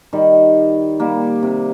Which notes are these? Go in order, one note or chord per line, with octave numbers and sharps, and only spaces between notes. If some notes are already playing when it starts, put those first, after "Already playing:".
D#3 G3
G3 A#3
C3